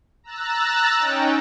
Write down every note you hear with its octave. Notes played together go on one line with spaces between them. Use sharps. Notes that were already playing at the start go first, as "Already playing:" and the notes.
A#5 E6 F#6 A6
C#4 D#4 G5